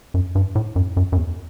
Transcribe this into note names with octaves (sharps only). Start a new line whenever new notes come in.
F#2
G2
A2
F#2
F#2
F#2
E2